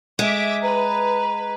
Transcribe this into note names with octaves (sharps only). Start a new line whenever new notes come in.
G#3 E5 D6
B4 A#5